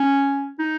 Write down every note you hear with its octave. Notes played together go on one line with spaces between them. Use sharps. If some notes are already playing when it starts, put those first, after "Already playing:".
Already playing: C#4
D#4